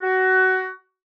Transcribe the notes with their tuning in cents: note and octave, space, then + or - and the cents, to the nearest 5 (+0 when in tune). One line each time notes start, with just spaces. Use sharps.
F#4 +20